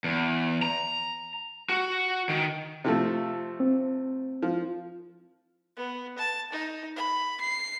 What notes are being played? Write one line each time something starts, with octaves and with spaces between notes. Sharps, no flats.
E2
A#5
F#4
D#3
C3 F3 A3
C4
F3
B3
A5
D#4
B5
C7